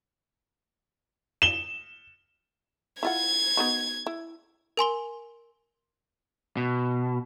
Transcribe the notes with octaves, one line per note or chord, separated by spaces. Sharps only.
E7 G7
E4 F4 F#5 G#6
B3 D#4 F#4
E4
A#4 G#5 C6 G7
B2